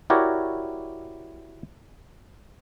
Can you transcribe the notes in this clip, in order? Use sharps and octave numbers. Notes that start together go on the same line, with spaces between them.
E4 F#4 G4 A#4 C#5 D5